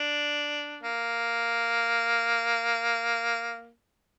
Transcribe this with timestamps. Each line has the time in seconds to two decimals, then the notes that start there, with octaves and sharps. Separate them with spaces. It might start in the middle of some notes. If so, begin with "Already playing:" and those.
Already playing: D4
0.83 A#3